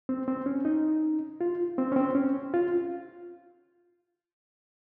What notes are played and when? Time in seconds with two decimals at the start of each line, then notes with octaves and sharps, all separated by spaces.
0.09 C4
0.28 C4
0.46 C#4
0.65 D#4
1.41 F4
1.78 C4
1.92 C#4
1.96 C4
2.15 C#4
2.54 F4